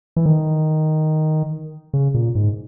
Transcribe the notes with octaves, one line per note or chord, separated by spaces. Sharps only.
E3
D#3
C#3
A#2
G#2